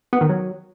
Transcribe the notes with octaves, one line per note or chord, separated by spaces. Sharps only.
B3
D#3
F#3